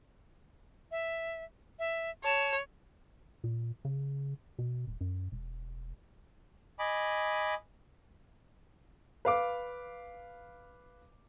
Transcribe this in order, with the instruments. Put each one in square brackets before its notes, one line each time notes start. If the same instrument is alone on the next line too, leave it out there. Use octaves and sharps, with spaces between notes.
[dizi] E5
E5
[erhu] C#5 [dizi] A5
[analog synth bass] A#2
C#3
B2
D#1
F#2
E1
[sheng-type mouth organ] D#5 G#5 B5 D6
[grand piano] B4 F5 D6